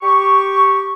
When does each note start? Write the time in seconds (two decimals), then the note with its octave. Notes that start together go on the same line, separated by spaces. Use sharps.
0.02 G4 C#6